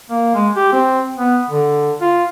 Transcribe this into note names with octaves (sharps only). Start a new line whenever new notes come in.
A#3
G#3
G4
C4
B3
D3
F4